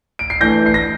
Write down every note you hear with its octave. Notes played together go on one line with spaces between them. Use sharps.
D7
C7
E3 A3 D4 G6 A#6
C7
A#6